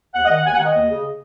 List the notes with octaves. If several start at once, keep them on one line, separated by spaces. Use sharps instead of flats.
D#2 F#5
D#5
D#3 F#5
D#2 G#5
F#5
D#3
D#5
D#2
C#3